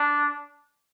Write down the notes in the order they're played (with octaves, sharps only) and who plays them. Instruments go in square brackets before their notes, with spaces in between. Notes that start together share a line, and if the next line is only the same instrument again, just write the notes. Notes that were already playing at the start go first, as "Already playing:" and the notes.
Already playing: [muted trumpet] D4